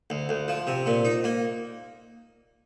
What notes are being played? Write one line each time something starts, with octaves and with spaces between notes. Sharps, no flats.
D2
D2
F3
C3
A#2
D#4
A#3